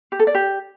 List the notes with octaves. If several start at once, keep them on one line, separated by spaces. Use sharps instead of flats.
G4
A4
D5
G4